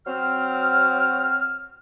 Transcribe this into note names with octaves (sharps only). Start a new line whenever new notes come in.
F#3 C4 C5 F6